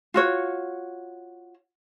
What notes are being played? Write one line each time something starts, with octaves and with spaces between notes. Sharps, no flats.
F4 F#4 C#5